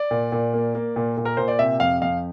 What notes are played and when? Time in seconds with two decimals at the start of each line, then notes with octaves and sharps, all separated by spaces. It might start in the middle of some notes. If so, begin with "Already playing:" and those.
Already playing: D5
0.11 A#2
0.32 A#2
0.54 A#3
0.75 A#3
0.96 A#2
1.17 A#2
1.25 A#4
1.37 A#2 C5
1.48 D5
1.59 C3 E5
1.80 F2 F5
2.02 F2 F5